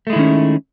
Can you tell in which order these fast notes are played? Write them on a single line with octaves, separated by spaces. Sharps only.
A3 G#3 E4 D#3 C#4